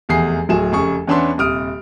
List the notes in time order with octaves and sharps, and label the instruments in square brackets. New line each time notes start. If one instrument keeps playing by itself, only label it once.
[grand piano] F1 E2 G#4 C7
D1 F#3 G#4 E7
F1 C#3 G#4 C#6
E2 B3 C#4 D4 E5 C6
D#1 C3 D#6 F6 D7